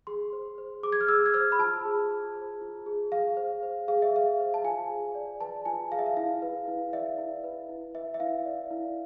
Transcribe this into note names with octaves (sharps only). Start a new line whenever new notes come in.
G#4 C6
C5
C5
G#4 D6
G#6
F6
G#4 E6
G#6
C5 F6
B5
F4 A5
G#4
F4
C5
F4
G#4
G#4 F5
C5
C5
G#4 F5
E5
G#4 F5
C5
A5
F4 G#5
G#4
D5
B4 A5
F4 G#5
G#4 F5
E5
F5
E4 F5
B4
E4
D5 E5
E4
B4
E4
B4 E5
E5
E4 F5
D5
E4